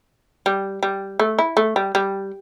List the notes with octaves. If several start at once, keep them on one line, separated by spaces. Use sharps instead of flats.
G3
G3
A3
E4
A3
G3
G3